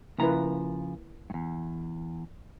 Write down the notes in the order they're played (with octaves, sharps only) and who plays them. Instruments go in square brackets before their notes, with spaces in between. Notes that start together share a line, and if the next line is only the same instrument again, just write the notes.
[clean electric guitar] C#3 F3 A#5 [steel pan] A#3 E4 B4
[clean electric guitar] E2 G2